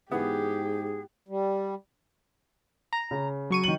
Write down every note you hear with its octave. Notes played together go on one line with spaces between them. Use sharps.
G#2 E3 B3 G4 G#4
G3
A#5
C#3
F#3 C#6 D#7
D#3 F#7